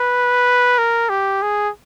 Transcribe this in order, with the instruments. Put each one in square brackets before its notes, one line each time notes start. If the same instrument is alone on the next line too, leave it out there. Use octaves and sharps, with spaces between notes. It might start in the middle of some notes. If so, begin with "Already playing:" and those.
Already playing: [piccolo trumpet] B4
A#4
G4
G#4